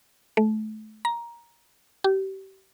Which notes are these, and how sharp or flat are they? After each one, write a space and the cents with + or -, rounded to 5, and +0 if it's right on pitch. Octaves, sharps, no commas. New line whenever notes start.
A3 -30
A#5 +10
G4 -30